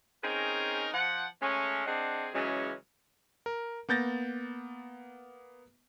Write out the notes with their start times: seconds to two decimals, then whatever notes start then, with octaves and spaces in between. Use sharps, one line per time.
0.24 C4 C#4 D#4 G#4 A#4
0.94 F3 F#5
1.42 G#3 A3 C#4
1.87 C4 D4 G#4 D#5 F#5
2.34 C#3 E3 F#3 G#3 C#4
3.46 A#4
3.89 A#3 B3 G6 A6 A#6